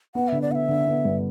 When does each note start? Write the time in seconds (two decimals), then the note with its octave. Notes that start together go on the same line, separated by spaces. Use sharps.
0.15 B3 F#5
0.28 D3 E5
0.42 D5
0.50 B3 F#5
0.55 E5
0.69 D3
0.87 B3
1.05 G2